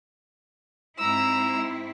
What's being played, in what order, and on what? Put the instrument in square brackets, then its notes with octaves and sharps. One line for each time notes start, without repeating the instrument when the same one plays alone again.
[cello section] G#2 C4 E4 [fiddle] A#5 E6